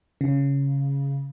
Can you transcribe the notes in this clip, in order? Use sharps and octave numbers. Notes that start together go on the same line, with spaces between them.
C#3